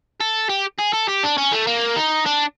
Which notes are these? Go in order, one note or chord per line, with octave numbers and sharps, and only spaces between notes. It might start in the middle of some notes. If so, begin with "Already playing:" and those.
A4
G4
G#4
A4
G4
D4
C#4
A3
A#3
D#4
D4